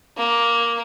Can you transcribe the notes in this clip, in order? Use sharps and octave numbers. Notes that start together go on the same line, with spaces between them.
A#3